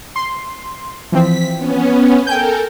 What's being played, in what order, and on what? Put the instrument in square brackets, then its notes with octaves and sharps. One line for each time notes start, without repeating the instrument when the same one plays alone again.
[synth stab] C6
[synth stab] E3 F3 C4 [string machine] B6
[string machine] B3 C#4
[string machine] A4 A#4 [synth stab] G5 G#5 G6